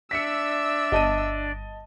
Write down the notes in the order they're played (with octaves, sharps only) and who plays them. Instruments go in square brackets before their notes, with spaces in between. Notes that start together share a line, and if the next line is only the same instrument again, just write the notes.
[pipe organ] D4 D5 [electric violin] E5 E6 [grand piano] B6 C#7
[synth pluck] G1 [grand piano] D#5 A5 D#7